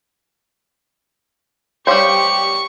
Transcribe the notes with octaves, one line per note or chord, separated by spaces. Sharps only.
G3 G4 C5 C#5 F5 C#6 D6